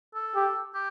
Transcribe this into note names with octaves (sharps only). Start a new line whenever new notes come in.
A4
G4
G4